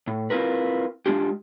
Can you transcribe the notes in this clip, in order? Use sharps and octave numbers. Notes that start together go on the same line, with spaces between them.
A2
C4 E4 F4 A#4 B4
G#3 D4 F4 G4